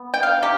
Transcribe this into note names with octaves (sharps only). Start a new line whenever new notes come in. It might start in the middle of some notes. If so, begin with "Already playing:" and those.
Already playing: B3
G5
F5
C3 G4